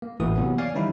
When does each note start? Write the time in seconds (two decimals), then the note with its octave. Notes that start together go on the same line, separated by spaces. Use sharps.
0.02 A#3
0.20 A1 E3 A3 F#4 D#6
0.36 C3 E3 F#3 A#3 B3
0.58 C#5 D5 F5 G#5
0.74 D#3 E3 G3 C#4 D#4 E4